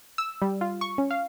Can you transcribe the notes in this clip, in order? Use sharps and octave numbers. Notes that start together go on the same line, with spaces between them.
E6
G3
F4
C#6
C#4
F5